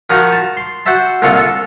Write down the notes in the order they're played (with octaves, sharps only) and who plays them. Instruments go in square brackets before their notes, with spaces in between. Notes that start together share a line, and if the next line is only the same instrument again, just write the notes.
[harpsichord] D#3 F3 D#4 F#4
A5
C6
F#4 C5 E5 A5
C2 A#2 D3 F4 C#6
A4